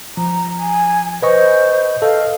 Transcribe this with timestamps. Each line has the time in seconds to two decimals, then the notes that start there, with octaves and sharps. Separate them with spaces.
0.17 F3 A#5
0.59 G#5
1.22 B4 C5 D#5 C#6
2.02 A4 D#5 F5